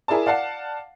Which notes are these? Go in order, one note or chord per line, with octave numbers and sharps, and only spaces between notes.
E4 G#4 A#4 D5 A5
D5 F5 F#5 A5 C7